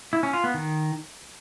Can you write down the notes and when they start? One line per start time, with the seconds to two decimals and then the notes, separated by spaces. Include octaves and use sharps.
0.13 E4
0.23 C#4
0.33 F4
0.44 B3
0.54 D#3